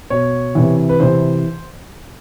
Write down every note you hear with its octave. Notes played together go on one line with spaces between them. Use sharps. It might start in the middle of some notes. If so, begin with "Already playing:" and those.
B2 C#5
C3 E3
B4
C3 E3 C5